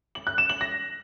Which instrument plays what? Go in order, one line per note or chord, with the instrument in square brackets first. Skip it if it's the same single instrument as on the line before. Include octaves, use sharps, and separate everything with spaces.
[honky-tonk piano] F#7
F#6
E7
F#7
A#6